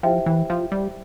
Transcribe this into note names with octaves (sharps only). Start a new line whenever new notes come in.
F3 E4 G4 C5 E5 G5
E3
F3
G3